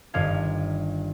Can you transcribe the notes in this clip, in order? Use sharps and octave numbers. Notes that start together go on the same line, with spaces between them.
G1 G2 D#3 F5 G#6